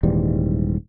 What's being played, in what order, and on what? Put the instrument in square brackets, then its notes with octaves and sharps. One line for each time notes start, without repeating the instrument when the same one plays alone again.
[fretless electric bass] D#1 G#2 E3 G3